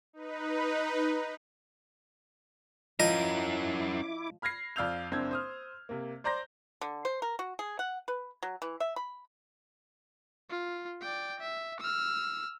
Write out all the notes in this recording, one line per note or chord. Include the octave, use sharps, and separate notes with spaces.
D#4 B4
F3 C#4 E4 A#4 D#5 D6
B5 F6 G#6 A#6 C7
F2 D5 F5 E6 G6 F7
F#1 C4 D4 G#6
C5 D#6 F6
C3 A#3
C5 D5 A#5 C6 G6 A#6
D3
C5
A#4
F#4
G#4
F#5
B4
F#3
E3
E5
B5
F4
D5 G5
E5
E6 F6